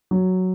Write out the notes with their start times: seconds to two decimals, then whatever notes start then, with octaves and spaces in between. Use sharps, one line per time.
0.11 F#3